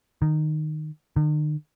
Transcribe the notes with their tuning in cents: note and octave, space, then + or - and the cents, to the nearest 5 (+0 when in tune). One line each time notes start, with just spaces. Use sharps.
D#3 -15
D#3 -45